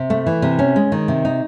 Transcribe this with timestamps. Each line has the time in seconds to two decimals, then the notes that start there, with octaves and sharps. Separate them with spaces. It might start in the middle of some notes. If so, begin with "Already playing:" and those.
Already playing: C3
0.10 A3
0.26 E3
0.42 C3
0.59 C#4
0.76 G#3
0.92 D#3
1.08 C3
1.25 D#4